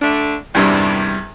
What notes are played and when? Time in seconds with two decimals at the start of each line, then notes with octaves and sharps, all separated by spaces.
0.01 D3 A3 D4
0.55 E2 G2 C3 D#3 G3 D4